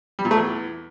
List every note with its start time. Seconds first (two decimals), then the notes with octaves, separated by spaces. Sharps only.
0.19 G3
0.25 A#2
0.31 A3
0.37 E2